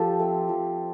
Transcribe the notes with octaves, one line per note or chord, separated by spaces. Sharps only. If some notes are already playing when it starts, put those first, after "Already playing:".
Already playing: F3 G4 A4
A3 C4
F3